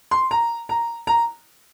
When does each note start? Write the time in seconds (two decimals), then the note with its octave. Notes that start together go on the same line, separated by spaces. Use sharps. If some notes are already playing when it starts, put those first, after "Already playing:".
0.11 C6
0.31 A#5
0.69 A#5
1.07 A#5